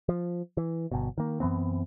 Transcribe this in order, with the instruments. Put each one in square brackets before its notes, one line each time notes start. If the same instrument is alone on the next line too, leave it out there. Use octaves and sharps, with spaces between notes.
[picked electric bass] F3
E3
G1 B2
D#3 A#3
F#2 E3 B3 C4